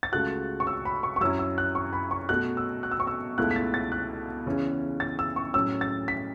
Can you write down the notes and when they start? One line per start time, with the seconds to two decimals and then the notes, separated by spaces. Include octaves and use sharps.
0.03 A6
0.12 C#2 C#3 A3 F#4 F#6
0.60 C#6
0.67 E6
0.85 B5
1.03 C#6
1.16 C#6
1.21 F#2 F#3 C#4 E4 E6
1.39 E6
1.58 F#6
1.75 C#6
1.93 B5
2.11 C#6
2.29 B2 A3 F#4 F#6
2.57 E6
2.83 F#6
2.91 E6
3.00 C#6
3.07 E6
3.38 C#2 B2 A3 E4 F#6
3.51 B6
3.56 A6
3.74 A6
3.92 F#6
4.46 E2 C#3 E3 C#4
5.00 A6
5.19 E6
5.36 C#6
5.54 A2 F#3 C#4 E6
5.81 A6
6.08 B6